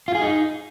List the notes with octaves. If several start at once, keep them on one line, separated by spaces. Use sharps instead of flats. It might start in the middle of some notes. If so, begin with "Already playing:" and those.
F4
G#4
D#4